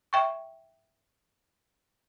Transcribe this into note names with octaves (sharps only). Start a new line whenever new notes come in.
E5 G5 C#6